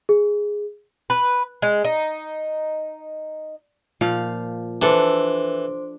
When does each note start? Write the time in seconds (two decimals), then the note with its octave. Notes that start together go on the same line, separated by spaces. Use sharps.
0.09 G#4
1.10 B4
1.62 G#3
1.84 D#4
4.01 A#2 F3 F5
4.82 E3 D4 A4 C5 C6 D6